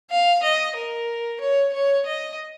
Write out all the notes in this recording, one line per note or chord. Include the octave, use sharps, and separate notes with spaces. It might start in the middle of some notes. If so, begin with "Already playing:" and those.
F5
D#5
A#4
C#5
C#5
D#5